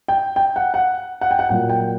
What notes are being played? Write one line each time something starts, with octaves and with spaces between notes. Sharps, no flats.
G5
G5
F#5
F#5
F#5
G5
F#5
A#2 F#3 A#3 F#5
G5